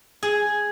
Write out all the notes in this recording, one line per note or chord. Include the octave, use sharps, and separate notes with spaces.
G#4